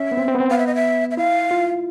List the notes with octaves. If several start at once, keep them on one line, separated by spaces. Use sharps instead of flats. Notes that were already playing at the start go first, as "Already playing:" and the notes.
Already playing: C#4 E5
B3
C4
C4
B3
C4
B3 F5
E5
D#5
E5
E5
E4 F5
F4